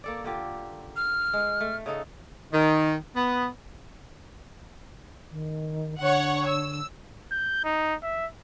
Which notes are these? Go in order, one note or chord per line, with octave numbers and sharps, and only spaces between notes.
A#3 A4 D5
D3 F4 G4
F6
G#3
A3
C#3 D#4 A4
D#3
B3
D#3
D3 C#5 F#5
E6
G6
D#4
E5